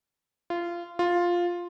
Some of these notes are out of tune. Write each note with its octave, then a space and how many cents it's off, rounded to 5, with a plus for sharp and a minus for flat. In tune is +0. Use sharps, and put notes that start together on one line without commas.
F4 -20
F4 +5